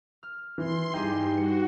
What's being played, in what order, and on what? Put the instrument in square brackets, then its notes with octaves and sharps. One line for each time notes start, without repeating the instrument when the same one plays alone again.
[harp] F6
[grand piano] E3 [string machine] C6
[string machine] G2 [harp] D#4 G4 G#4 [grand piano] G5
[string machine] F#4 [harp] C#7